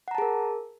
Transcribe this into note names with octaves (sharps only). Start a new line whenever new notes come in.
G#4 A#4 F#5 A5 A#5